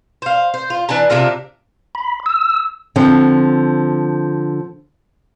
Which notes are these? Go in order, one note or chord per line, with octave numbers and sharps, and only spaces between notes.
C5 F5
C5
F4
E3 D4 G#5 A5
C3 D4 F4 A#4
B5
E6
D3 F3 C4